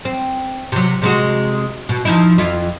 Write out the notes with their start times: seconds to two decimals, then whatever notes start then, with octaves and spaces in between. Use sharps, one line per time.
0.05 C4
0.72 C3 F#3
1.02 C3 G#3 F#4
1.89 B2
2.05 F3 D#4 E4
2.38 F2 E4 F4